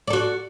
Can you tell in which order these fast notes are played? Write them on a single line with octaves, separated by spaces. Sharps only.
D5 A4 F#4